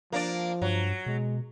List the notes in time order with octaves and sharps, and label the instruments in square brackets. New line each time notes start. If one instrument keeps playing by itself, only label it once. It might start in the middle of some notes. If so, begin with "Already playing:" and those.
[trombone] F3 [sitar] A#3 D4 D5
[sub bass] G2 [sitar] F#3
[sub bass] B2 [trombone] G#3